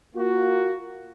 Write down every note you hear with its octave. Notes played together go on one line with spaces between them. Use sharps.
A#3 F4 F#4